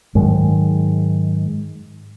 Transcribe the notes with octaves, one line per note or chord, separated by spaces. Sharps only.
G#2 D#3 F#3 G#3